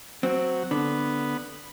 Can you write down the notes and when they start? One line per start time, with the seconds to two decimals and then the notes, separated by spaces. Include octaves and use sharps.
0.23 F#3 C4
0.71 D3 B3